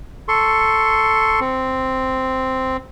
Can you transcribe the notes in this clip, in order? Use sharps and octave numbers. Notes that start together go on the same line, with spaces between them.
A4 C6 C#6
C4